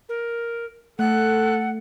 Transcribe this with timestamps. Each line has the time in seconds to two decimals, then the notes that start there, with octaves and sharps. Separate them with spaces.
0.08 A#4
0.99 A3 A4 F#5 F#6